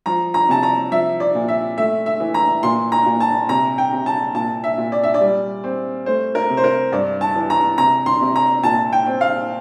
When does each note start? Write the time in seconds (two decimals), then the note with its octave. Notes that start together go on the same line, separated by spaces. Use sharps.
0.06 F3 A#5
0.34 A#5
0.49 C3 A5
0.63 A#5
0.92 F3 E5
1.20 D5
1.35 A#2
1.48 E5
1.78 A3 E5
2.06 E5
2.20 E3
2.34 A#5
2.63 A#2 C6
2.92 A#5
3.06 A#2
3.20 A5
3.49 C3 A#5
3.78 G5
3.92 C3
4.06 A5
4.35 A#2 A5
4.64 E5
4.78 A#2
4.92 D5
5.03 E5
5.14 D5
5.20 G3
5.64 C4
6.06 A3 C5
6.35 A#4
6.50 C3
6.57 C5
6.64 A#4
6.92 G2 D5
7.21 A5
7.35 E3
7.50 A#5
7.78 C3 A#5
8.06 C6
8.21 C3
8.36 A#5
8.63 A#2 A5
8.93 G5
9.06 C4
9.21 F5